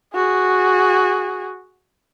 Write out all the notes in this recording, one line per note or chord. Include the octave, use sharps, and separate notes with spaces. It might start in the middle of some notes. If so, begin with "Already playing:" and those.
F#4 G#4